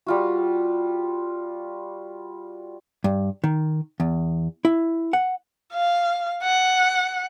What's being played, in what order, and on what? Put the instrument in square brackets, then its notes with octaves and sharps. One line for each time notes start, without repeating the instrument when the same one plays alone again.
[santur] G3 F4 F#4
[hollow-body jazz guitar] G2
D#3
E2
E4
F#5
[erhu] F5
F#5